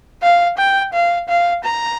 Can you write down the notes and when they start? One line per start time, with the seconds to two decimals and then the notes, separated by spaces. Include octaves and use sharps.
0.23 F5
0.58 G5
0.93 F5
1.28 F5
1.64 A#5